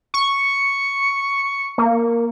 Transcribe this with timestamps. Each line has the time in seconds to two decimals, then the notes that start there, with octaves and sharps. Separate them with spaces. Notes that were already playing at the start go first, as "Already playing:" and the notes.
0.14 C#6
1.78 A#3